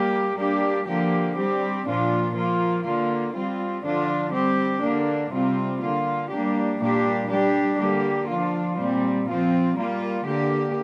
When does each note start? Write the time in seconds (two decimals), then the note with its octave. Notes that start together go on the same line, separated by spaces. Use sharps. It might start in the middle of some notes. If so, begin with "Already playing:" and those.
Already playing: G3 A#3 G4
0.37 G3 A#3 D4 G4
0.86 D3 F3 A#3 G4
1.36 G3 C4 G4
1.85 A#2 F3 D4 F4
2.34 F3 A#3 F4
2.84 D3 A#3 F4
3.33 G3 C4 F4
3.83 D3 F3 D4 F4
4.32 G3 C4 G4
4.81 D3 A#3 D4
5.31 C3 G3 C4 F4
5.81 D3 A#3 F4
6.30 G3 A#3 D4 G4
6.79 A#2 G3 A#3 D4 G4
7.29 G3 D4 G4
7.78 D3 G3 A#3 G4
8.27 F3 D4 F4
8.77 A#2 G3 C4
9.26 F3 C4 F4
9.76 G3 A#3 F4
10.25 D3 A#3 G4